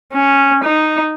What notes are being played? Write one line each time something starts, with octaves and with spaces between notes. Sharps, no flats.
C#4
D#4